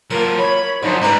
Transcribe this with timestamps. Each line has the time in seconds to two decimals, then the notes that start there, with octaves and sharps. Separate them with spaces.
0.11 F#3 A#3 F4 A#4
0.39 C#5 B5
0.83 F#2 D3 F3 D#4
1.02 G#2 G3 B4 D5 D#5 A#5